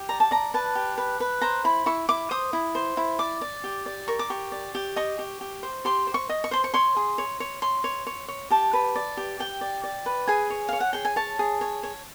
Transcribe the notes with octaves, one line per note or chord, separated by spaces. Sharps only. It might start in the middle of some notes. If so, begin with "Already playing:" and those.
Already playing: G4
D5 A#5
A5
D5 A#5
B4 A5
G4
B4
B4
C5 A#5
E4 B5
E4 C#6
E4 D6
C5 D#6
E4
C5
E4
D5 D6
D5
G4
D5
A#4 C#6
D6
G4 C#6
D5
G4
D#5 C#6
G4
G4
C5
G4 C6
C5
C#6
D#5
C#6
C5 C6
C#6
C#5 C6
G#4
C#5
C#5
C#5 C6
C#5
C#5
C#5
G4 A5
B4
D5
G4
G4 G5
D5
D5
B4
G#4 G#5
C#5
C#5 F5
F#5
G#4 G5
G#5
C#5 A5
G#4
C#5
C#5